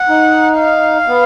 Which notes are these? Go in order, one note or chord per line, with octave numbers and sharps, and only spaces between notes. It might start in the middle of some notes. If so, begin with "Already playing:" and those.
Already playing: F#5
D#4
F5
B3